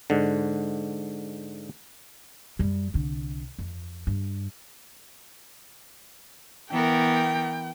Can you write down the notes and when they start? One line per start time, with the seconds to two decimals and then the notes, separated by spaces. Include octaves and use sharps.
0.10 G#2 D3
2.59 F#2 G3
2.94 C2 D3
3.59 F2
4.07 G2
6.71 E3 B3 A#4 G5